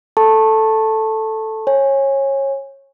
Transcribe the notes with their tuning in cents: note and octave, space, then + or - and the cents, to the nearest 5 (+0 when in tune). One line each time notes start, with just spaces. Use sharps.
A4 +0 A5 +0 C#6 -25
C#5 -20 G#5 -15